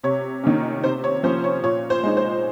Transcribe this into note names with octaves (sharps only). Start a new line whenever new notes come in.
C3 C#5
D#3 A#3 C#4
C3 C5
C#5
F3 A#3 C#4 C5
C#5
A#2 C#5
C5
G#3 D#4
C5